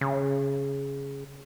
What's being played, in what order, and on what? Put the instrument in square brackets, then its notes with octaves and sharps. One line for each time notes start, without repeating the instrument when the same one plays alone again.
[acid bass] C#3